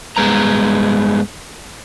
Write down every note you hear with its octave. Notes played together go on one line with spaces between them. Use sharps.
G2 G#3 B3 A#5